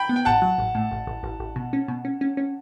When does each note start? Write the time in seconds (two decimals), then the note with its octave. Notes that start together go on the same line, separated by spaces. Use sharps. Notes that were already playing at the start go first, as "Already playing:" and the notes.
Already playing: G5 B5
0.09 B3
0.16 G5
0.25 A1 F#5 A5
0.42 F#3
0.58 A1
0.75 A2
0.92 A1
1.07 A1
1.23 A1
1.40 A1
1.56 B2
1.73 C#4
1.88 B2
2.05 C#4
2.21 C#4
2.37 C#4